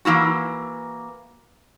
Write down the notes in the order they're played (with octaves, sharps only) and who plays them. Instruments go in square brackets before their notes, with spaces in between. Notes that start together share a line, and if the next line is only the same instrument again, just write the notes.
[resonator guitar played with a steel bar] E3 A#3 E4 F#4